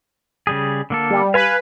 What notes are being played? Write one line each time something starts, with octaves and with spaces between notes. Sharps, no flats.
C#3 G3 G#4
D3 A#3 A4
G3
B4 F5 G#5 B5